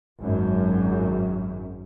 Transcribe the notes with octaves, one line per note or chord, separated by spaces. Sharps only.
G#1 F#2